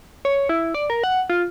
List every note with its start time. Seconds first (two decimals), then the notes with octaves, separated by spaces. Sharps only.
0.25 C#5
0.49 E4
0.74 D5
0.90 A#4
1.04 F#5
1.30 F4